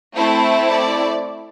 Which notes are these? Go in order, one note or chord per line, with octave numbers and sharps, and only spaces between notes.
A3 C4 E4 A4 C5
D5